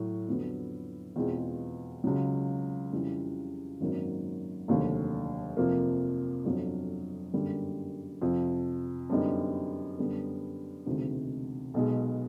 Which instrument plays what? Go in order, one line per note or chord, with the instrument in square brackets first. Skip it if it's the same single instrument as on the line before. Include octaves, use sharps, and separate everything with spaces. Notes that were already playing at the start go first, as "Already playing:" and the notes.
Already playing: [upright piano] A2 F#3
F2 D3 F#3 B3
E2 B2 G#3 C4 F4
C#2 C#3 F#3
F2 C#3 E3 G3
G#1 F#2 D#3 F#3 A#3
F1 D#2 D3 F#3
F2 C3 F3 A#3
G1 F2 D3 F#3
G1 F#2 D3 G3 A#3
F2 C3 F3
F#2 D3 G3 B3 D#4
F#2 D3 G3 B3
E1 D2 C3 D#3 G#3
B1 B2 G#3